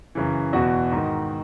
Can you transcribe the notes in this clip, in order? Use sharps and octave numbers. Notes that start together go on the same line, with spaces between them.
F#2 C#3 E3
E2 B2 F#4
G#2 D#3